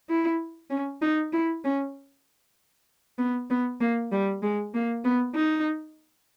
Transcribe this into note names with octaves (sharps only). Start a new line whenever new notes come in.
E4
C#4
D#4
E4
C#4
B3
B3
A#3
G3
G#3
A#3
B3
D#4